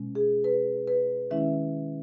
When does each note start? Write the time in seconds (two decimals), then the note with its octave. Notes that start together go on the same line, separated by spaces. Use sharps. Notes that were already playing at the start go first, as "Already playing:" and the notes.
Already playing: B2 G#3 C#4
0.15 G#4
0.44 B4
0.88 B4
1.31 D#3 G#3 C#4 E4 E5